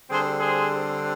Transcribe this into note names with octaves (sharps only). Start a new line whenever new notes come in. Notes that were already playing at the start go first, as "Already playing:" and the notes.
D3 G3 C4 G#4 C5
G#4 C5